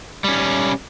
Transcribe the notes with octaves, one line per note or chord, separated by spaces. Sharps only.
G3 C#4